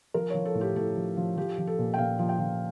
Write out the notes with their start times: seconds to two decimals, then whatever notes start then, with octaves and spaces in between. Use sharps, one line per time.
0.14 F3 A#4
0.30 F3 C#5
0.45 A4
0.55 A2
0.61 G4
0.75 A2 A4
0.96 F3
1.17 F3
1.37 F3 G4
1.58 F3
1.67 A4
1.78 A#2
1.94 G5
1.98 A#2 F5
2.19 F3
2.29 G5
2.39 F3